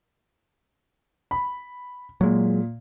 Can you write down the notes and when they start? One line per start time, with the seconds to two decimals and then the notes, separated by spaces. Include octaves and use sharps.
1.31 B5
2.21 A#2 F#3 G#3